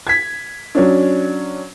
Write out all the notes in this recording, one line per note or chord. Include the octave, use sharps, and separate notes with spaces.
G#6 B6
F#3 C#4 D4